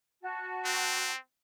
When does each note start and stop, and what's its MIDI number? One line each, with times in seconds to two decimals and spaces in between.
0.21 1.09 66
0.21 1.09 81
0.65 1.18 60